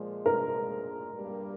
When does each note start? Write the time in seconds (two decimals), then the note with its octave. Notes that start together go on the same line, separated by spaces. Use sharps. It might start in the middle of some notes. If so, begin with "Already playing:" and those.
Already playing: A#2 F3 G#3
0.26 A#4
1.14 G2 G3 A#3